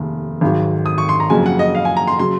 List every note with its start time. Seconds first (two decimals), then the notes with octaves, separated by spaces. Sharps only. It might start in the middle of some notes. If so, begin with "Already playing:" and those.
Already playing: F1 D#2 C#3
0.41 G#1 G#2 D#3 F#3
0.86 D#6
0.98 C#6
1.09 C6
1.20 A#5
1.30 F#1 F2 C#3 F#3 G#5
1.46 F#5
1.59 D#5
1.75 F5
1.85 G#5
1.97 A#5
2.07 C6
2.19 C#3 F#3 C6